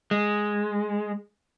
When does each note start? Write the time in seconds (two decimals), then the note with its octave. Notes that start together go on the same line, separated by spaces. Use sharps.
0.11 G#3